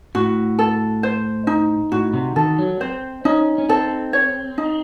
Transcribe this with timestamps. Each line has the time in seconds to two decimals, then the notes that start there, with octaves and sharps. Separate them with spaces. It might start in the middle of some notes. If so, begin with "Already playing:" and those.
0.15 A2 F#4
0.59 A4
1.03 C5
1.47 D#4
1.92 A2 F#4
2.13 C3
2.36 D#3 A4
2.59 F#3
2.80 C4 C5
3.25 C#4 D#4
3.58 C#4
3.69 C4 A4
4.13 C#5
4.58 D#4